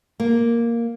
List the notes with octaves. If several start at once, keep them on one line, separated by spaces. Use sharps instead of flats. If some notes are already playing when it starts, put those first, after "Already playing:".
A#3